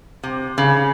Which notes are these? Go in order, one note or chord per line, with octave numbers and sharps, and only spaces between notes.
C3
C#3